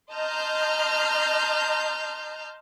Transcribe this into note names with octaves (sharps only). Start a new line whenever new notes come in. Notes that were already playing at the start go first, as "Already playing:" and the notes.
D#5 A5 A#5 C6 F6 G6